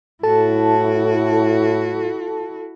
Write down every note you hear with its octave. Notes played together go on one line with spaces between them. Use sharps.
A2 E4 F#4 A4 A5